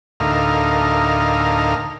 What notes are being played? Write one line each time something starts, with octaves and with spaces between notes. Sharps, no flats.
D2 A2 D#4 A#4 F5